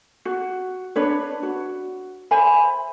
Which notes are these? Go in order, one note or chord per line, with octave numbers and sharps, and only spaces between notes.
F#4
D4 B4 C#5
F#4
C5 E5 G#5 B5